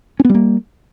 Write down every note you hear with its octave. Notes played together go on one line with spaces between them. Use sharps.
G3 A#3 B3 C#4